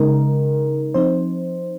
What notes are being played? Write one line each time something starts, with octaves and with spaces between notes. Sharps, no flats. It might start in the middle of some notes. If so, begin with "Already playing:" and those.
Already playing: C#3 G#3 D#4 A#4
F3 C4 D#4 C5